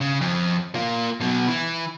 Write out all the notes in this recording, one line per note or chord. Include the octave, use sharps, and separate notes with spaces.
C#3
F2
A#3 F4
B2 F#3
E3